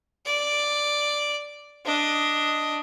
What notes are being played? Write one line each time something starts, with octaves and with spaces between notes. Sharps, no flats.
D5
D4 D#5